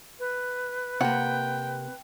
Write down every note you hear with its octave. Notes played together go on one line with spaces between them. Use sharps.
B4
C3 A#3 F#5 G5